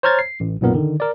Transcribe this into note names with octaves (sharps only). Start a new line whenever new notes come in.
C5 C#5 A#5 F6 G#6 A6
C7
A1
B1 F#2 A#2 B3 A#4
D3 D#3
A#4 D5